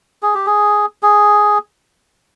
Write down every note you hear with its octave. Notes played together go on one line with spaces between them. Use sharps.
G#4
G4
G#4
G#4